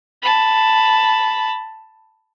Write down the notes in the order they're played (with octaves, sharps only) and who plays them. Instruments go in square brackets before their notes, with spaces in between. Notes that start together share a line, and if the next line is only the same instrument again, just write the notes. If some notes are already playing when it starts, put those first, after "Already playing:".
[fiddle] A5 B5